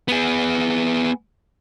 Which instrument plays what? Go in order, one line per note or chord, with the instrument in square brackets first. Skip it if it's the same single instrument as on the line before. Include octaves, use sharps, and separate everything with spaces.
[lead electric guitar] B3 G#4